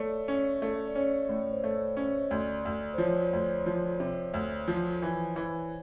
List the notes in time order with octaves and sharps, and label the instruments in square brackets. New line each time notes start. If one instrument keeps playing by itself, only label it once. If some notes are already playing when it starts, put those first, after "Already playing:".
Already playing: [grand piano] A3 [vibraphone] C#5 D5
[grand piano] C#4
A3
[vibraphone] D5
[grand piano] C#4 [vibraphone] C#5
[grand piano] A2
[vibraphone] C5
[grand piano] A3 [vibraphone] C#5
[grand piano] C#4
[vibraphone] D#5
[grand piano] D2 [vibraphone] D5
[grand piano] D2
[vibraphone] C5
[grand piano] F3 [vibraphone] C#5
[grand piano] D2
F3
C3
D2
F3
E3
E3